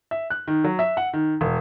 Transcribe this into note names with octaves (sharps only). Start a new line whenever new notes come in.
E5
F#6
D#3
F#3
E5
F#5
D#3
E1